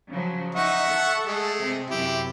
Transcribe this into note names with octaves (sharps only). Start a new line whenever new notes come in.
C#3 F3 F#3
D#4 E5 F#5 C#6
A4
G#3 A3
C3 C4
F#2 C3 E4 G4